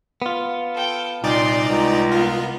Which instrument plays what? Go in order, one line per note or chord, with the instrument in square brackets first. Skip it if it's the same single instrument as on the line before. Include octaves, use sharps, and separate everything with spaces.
[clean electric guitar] B3 F4
[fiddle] A4 G5
[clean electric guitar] C2 [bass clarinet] A#2 [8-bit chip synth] D#4 D5 [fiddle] C6 D6
[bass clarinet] C#2 [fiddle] A#5
[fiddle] B3 A#4 [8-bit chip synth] F4